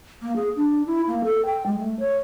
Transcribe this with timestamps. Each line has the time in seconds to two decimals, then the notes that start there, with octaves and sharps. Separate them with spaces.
0.22 A#3
0.36 G#4
0.56 D4
0.87 E4
1.08 A#3
1.24 A4
1.46 G5
1.66 G#3
1.78 A3
1.99 C#5